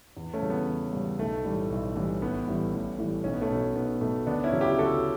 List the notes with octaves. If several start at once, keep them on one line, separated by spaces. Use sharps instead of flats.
E2
A3 C#4
C#3 E3 G3
B3
E2
C#3 E3 G3
B1 A3
A2 E3 G3
B1
A2 E3 G3
A1 B3
A2 E3 G3
A1
A2 E3 G3
B1 C#4
B3
A3 C#4
B2 F#3
B1 B3
B2 F#3 A3
D2 B3 D4
C#4 E4
C#3 F#3
E4 G4
D2 F#4 A4